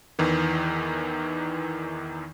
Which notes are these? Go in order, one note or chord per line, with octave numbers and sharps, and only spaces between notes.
E2 D#3 E3